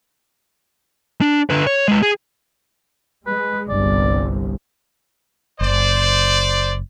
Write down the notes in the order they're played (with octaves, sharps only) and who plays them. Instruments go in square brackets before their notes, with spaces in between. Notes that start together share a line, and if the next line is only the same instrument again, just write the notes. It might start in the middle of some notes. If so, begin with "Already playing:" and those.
[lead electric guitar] D4
D3 B4
C#5
G#3 B4
G#4
[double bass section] G#3 [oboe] B4
[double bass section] G1 C2 [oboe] D5
[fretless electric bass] F#1 [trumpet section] C5 D5